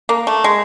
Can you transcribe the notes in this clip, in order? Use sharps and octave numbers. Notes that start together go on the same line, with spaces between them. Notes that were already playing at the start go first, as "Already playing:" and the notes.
A#3
A3
G#3